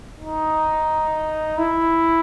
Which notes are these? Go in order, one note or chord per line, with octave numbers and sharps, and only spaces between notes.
D#4
E4